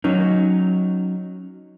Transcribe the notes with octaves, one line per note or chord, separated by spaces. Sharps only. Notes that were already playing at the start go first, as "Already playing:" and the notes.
F#3 C#4 D#4